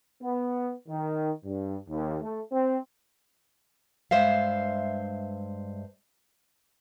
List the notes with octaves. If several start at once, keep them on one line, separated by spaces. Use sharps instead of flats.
B3
D#3
G2
D#2
A3
C4
G2 G#3 C5 E5 F5